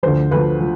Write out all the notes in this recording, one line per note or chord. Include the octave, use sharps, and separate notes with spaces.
D2 D3 F3 C5
D2 D3 F3 B4
F3